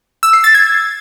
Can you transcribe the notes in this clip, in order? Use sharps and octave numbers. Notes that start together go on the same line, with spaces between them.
E6
C7
A6
G#6